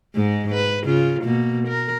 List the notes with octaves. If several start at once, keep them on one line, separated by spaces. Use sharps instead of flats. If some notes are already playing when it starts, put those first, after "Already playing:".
G#2 G#3
B4
C#3 F4
B2 A#3
A#4